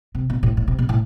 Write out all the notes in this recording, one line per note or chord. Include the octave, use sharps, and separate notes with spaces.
C3
B2
A2
A2
C3
B2
A2